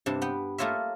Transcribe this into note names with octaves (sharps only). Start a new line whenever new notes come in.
G2 C3 A5
B3 G5
A3 A#3 F4 C#5 E5